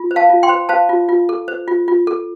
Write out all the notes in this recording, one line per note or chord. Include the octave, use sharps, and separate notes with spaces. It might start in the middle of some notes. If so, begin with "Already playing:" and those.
Already playing: F4
C5
F5 A5
F4
G5 C6
C5
C5 F5 A5
F4
F4
A4
C5
F4
F4
A4